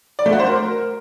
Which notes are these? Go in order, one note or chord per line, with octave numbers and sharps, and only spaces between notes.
D5
A3
F#4
C5
A#4